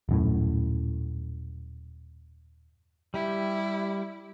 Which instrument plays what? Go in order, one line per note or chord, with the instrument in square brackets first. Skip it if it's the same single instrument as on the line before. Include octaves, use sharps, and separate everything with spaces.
[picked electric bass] D#1 F#2 A2
[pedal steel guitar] G3 G4 [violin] E4